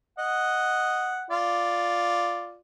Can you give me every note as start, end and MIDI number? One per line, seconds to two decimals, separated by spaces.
0.19 1.22 75
0.19 1.22 78
1.31 2.55 65
1.31 2.55 74